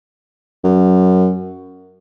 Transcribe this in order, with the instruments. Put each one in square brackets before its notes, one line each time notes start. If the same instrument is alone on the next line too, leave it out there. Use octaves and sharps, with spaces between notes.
[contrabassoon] F#2